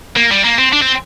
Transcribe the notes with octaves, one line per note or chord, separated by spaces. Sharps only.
A#3
G3
A#3
C4
D4
C4